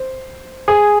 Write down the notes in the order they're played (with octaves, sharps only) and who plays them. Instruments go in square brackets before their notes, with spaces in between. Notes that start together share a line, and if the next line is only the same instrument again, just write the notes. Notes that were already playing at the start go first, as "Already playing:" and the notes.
Already playing: [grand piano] C5
G#4